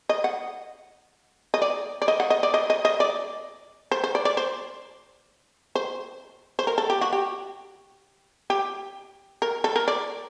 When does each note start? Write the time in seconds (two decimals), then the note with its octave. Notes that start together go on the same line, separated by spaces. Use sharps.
0.09 D#5
0.24 F#5
1.54 D#5
1.62 D5
2.02 D5
2.08 D#5
2.20 F#5
2.30 D#5
2.43 D5
2.54 D#5
2.70 D#5
2.85 D#5
3.00 D5
3.92 C5
4.04 C5
4.15 D5
4.25 D5
4.37 C5
5.75 C5
6.59 C5
6.67 A#4
6.78 A4
6.90 G4
7.01 F#4
7.13 G4
8.50 G4
9.42 A#4
9.64 A4
9.76 A#4
9.88 D5